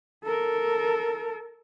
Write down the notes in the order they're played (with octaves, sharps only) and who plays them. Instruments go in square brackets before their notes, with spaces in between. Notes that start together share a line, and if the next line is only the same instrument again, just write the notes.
[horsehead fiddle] A4 A#4